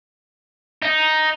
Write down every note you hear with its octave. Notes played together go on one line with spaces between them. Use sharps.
D#4